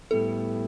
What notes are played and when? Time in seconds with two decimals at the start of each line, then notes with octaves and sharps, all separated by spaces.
0.11 A2 G3 B3 E4 A4